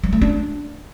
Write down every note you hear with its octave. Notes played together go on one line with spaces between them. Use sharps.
G3
A3
D4